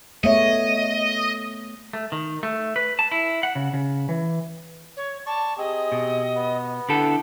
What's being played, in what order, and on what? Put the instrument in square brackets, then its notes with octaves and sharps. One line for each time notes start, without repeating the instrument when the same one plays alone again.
[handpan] A3 B3 C#5 [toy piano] G#4 E5 [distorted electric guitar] D#5
[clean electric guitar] A3
D#3
A3
B4
A5
E4
F#5
C#3
C#3
E3
[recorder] C#5
[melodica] D5 C#6 [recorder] A5
[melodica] C4 G#4 [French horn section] G4 [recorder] D#5
[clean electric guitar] B2
[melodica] B3
[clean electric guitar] D3 G4 A4 [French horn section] E4 [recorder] F#5